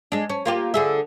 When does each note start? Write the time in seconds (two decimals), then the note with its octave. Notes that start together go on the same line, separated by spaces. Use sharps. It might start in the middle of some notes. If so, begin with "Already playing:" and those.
0.12 G#3 D4
0.30 C#4
0.45 A#3 F4 G4
0.74 D3 G#4 E5